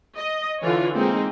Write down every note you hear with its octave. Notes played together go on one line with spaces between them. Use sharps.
D#5
D3 E3 F4 C#5
G#3 A#3 C4 D#4 G#4